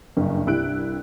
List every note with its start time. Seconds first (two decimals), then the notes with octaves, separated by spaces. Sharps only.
0.17 F#1 G2
0.46 C2 G2 E4 G4 F#6 D7